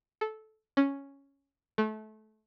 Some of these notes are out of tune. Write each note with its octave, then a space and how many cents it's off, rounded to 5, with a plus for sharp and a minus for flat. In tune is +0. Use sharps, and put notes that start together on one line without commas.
A4 -15
C#4 +0
A3 -25